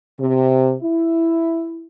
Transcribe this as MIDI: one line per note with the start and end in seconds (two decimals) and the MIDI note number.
0.19 0.74 48
0.82 1.87 64